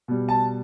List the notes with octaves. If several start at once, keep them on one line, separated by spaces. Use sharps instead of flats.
B2 G3
A5